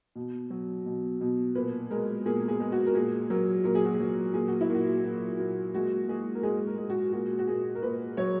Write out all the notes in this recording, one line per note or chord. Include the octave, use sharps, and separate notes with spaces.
B2
F#3
B2
B2
A#2 B4
G#3 A#4
A#2 G#4
G#4
G#3
F#4
A#4
A#2 G#4
F#3 A#4
A#2 A#4
G#4
F#4
G#4
F#3
A#2 G#4
F#4
E4
A#2 F#4
F#3
A#2
G#3 F#4
G#3 G#4
A#4
G#3 G#4
A#4
G#3
F#4
A#2 F#4
F#4
A#2 G#4
A#4
A#2 B4
F#3 C#5